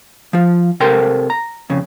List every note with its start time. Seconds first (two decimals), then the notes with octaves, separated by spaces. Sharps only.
0.33 F3 F4
0.80 C3 A4 A#4 C5 G5 C6
1.30 A#5
1.70 F2 C#3